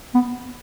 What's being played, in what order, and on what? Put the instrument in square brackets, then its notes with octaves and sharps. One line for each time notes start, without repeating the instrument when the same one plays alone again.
[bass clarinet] B3